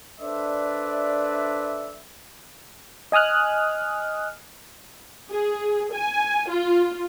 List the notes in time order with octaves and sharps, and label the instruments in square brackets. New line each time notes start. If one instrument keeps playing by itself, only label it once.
[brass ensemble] D4 A4 B4 C5 D5 E5
[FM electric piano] D#5 G#5 D#6 F6 F#6
[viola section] G#4
G#5
F4